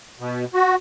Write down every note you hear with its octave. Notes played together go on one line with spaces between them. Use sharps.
B2
F#4